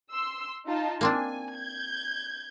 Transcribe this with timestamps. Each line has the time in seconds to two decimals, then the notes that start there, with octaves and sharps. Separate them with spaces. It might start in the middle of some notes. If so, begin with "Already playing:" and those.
0.11 C6 E6
0.66 D#4 F4 A5
1.01 A#3 C4 D4 G#5
1.58 G6 G#6